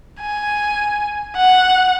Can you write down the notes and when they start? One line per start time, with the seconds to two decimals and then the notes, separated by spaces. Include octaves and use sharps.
0.21 G#5
1.37 F#5